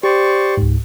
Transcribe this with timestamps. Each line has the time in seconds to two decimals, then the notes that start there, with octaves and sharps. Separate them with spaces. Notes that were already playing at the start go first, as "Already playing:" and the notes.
0.03 G4 C5 D5 C#6
0.57 C#2 G#2